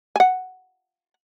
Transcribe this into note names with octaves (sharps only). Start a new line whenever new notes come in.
F#5 G#5